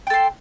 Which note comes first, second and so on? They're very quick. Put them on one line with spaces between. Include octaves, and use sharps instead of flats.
G5 A4 C6